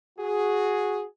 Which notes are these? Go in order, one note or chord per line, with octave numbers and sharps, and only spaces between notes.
F#4 G#4